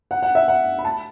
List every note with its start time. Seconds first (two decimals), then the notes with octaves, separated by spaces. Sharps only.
0.11 F#5
0.22 F#5
0.35 E5
0.48 F#5
0.79 B5
0.85 A5